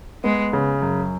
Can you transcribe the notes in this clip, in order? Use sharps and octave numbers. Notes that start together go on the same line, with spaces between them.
G#3 B3
C#3
F#2